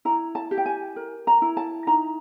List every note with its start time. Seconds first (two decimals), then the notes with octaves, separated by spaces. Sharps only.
0.05 E4 A#5
0.35 A5
0.51 G4
0.57 G5
0.66 G#5
0.96 A#4
1.27 A#5
1.42 E4
1.57 A5
1.87 D#4 A#5